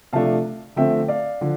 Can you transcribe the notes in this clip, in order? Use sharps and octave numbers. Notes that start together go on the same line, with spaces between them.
C3 F3 A3 D4 F5 A5
D3 F3 A3 C4 E5 G5
D5 F5
D3 F3